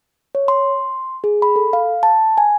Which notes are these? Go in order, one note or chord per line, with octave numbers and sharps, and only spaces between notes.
C#5
C6
G#4
B5
A4
F5
A5
G#5